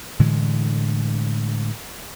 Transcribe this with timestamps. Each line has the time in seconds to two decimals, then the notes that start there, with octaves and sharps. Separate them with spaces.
0.19 A2 D3 E3 G#3